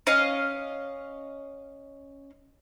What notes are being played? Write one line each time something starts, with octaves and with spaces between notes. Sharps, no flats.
C#4 D#5 F5